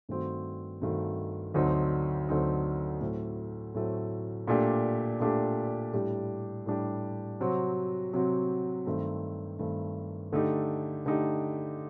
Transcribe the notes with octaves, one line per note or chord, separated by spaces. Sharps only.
G2 D#3 A3 C4 F#4
G2 D#3 A3 C4 F#4
D2 D3 F#3 C4 D#4
D2 D3 F#3 C4 D#4
A2 F#3 A3 C4
A2 F#3 A3 C4
A#2 A3 D4 G4
A#2 A3 D4 G4
A2 G3 D4 G4
A2 G3 D4 G4
C3 F#3 C4 F#4
C3 F#3 C4 F#4
G2 D#3 A3 C4
G2 D#3 A3 C4
D3 A3 D#4 G4
D3 A3 D#4 G4